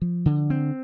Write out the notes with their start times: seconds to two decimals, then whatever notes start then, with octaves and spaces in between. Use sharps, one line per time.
0.02 F3
0.26 D3
0.50 C4